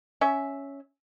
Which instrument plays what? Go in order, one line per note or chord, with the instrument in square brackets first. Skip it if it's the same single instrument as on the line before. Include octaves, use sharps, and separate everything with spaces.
[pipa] C#4 E5